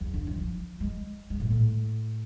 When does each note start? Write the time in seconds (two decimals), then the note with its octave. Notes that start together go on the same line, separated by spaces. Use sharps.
0.01 E2
0.14 D3
0.27 E3
0.41 F3
0.80 G#3
1.30 G#3
1.40 A2
1.50 A2